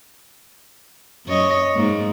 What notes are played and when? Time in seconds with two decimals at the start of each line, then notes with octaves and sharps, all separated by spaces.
1.26 F#2 C#5 D#5
1.74 G#2 G#3 A#3